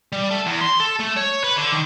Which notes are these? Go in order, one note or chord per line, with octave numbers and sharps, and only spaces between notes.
G3
A3
E2
C6
A4
A3
C#5
B4
D3
D#3